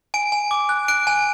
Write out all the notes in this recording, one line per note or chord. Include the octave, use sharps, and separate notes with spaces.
G#5 D7
G#5
D6
F#6
F#6 D7
G#5